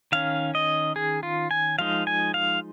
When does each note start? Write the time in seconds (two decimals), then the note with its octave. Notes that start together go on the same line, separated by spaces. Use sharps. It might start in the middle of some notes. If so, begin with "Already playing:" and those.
0.12 D#3 C#4 F5
0.55 D#5
0.96 G#4
1.23 F4
1.51 G#5
1.79 F3 G#3 D#4 F5
2.07 G#5
2.34 F5